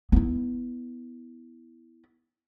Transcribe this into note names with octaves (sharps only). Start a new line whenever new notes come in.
B3 E4